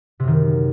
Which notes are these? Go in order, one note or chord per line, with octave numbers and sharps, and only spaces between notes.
F#2 C3 D#3